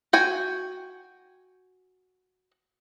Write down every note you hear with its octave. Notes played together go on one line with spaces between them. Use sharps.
F#4 G5 G#5